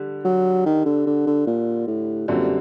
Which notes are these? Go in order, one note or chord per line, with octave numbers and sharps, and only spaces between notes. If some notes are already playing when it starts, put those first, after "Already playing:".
Already playing: D3 G3
F#3
D#3
D3
D3
D3
A#2
A2
F#2 A#2 D3 G3 C4